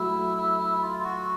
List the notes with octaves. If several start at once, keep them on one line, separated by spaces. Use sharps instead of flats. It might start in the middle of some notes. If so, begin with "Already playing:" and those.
Already playing: F#3 A3 E4
E4
E4
E4
F4
F4
F#4